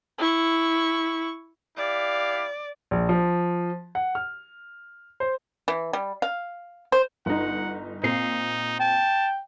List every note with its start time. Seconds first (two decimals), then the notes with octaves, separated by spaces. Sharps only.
0.18 E4 C#6
1.77 E4 G4 D5 F5
2.91 A#1
3.09 F3
3.95 F#5
4.15 F6
5.20 C5
5.68 E3
5.93 G3
6.22 F5
6.92 C5
7.26 G1 D#4 F#5
8.03 A#2 C4 D#4 C7
8.80 G5 A5